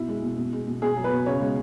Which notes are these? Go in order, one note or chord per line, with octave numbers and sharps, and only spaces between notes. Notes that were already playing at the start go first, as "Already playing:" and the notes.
Already playing: B2 E4
G#3
B2
B2
G#3
B2
B2 G#4
F#3
B4
B2
C#3 C#5
G#3